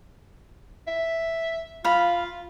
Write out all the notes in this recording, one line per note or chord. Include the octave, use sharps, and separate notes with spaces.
E5
F4 F5 B5